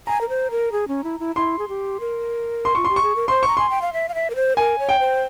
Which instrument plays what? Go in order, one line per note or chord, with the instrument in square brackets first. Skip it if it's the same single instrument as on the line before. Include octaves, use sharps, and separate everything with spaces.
[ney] G#5 [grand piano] A#5
[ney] A#4
C5
A#4
G#4
C#4
E4
E4
[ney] E4 [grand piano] C6
[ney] G#4
G4
A#4
[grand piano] C6
[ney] F4 [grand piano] C#6
[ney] G4 [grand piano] C6
[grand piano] C#6
[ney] G#4
A#4
[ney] C5 [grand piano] C6
[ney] A#5 [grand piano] C#6
[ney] G#5 [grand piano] C6
[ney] G5
F5
E5
F5
E5
A#4
C5
[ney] A#4 [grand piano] G#5
[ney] C#5
[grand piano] G5
[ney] C5